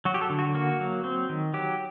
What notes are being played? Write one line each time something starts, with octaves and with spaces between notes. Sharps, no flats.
F#3 F#4
G4
A4
D3
F#4
A#3 F#4
F#3
C4
D#3
F#3 G4